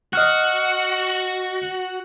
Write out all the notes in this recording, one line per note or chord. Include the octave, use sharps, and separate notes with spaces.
F#4 D#5 F6 F#6